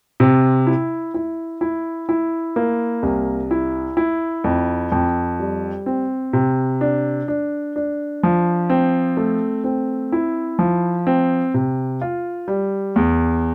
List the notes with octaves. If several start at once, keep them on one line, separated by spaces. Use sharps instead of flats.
C3
E4
E4
E4
E4
A#3
C2
E4
E4
F2
F2
G3
C4
C3
D4
D4
D4
F3
C4
A3
C4
E4
F3
C4
C3
F4
G3
E2